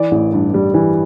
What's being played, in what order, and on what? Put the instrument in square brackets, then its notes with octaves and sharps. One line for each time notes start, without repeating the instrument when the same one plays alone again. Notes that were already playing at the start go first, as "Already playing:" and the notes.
Already playing: [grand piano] E3 D5
A1
G2
G3
E3